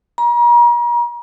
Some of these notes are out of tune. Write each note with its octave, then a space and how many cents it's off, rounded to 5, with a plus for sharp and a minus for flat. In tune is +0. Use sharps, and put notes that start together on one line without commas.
A#5 +40